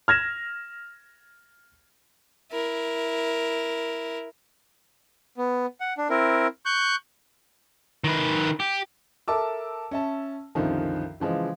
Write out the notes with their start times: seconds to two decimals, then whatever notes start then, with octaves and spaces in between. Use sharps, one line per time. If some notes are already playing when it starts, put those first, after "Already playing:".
0.08 F6 G#6 A#6 E7
2.52 E4 A#4
5.37 B3
5.81 F#5
5.98 D4
6.10 C4 E4 A#4
6.66 C#6 F#6 G6
8.04 D#3 B4
8.60 G4
9.28 A4 A#4 E5 A5 D6 E6
9.91 C#4 E5 A5
10.55 C2 F#2 D3 D#3 F3
11.20 C#3 E3 F3 G#3